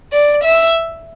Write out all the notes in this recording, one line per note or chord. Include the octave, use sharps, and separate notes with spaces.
D5
E5